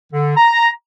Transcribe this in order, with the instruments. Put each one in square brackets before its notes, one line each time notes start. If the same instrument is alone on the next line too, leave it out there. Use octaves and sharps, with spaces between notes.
[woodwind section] D3
A#5